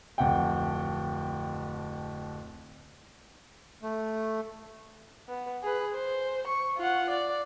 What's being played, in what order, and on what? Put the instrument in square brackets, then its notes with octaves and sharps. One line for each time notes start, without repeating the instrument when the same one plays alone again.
[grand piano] D1 F2 F#5 G5
[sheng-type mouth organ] A3
[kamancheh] B3
G#4 B4
C5
C#6
F4 F#5
D5